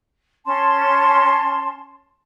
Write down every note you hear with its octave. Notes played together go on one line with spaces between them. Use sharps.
C#4 A5 C6